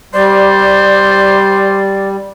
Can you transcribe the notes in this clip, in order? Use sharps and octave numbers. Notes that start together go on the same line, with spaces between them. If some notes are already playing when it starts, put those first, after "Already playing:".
G3 C5 D5